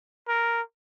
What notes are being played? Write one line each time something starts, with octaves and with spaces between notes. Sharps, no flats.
A#4